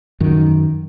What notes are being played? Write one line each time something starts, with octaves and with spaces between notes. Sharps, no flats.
F#2 D#3